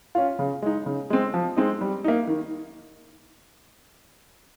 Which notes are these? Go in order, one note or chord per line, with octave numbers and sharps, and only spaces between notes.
C#4 F4
C#3
G#3 D#4
C#3
G#3 C4
F3
G#3 C4 D#4
G3
A#3 D#4
D#3